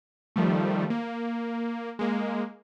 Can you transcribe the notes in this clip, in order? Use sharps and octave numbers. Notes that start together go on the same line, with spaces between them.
D#3 F3 G3 A3
A#3
G#3 A#3